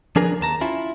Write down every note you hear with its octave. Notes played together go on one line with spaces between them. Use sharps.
F3 D4 G#4 A#4 B4
D#2 A5 A#5
C#4 E4 F4